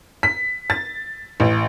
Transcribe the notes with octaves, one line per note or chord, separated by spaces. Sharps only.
B6
A6
A1